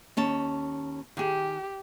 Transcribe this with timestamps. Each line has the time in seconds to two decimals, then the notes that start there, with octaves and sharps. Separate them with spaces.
0.17 D#2 C#4 A5
1.17 D#3 G4 G#4